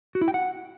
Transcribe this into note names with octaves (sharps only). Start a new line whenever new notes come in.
F#4
E4
G5
F#5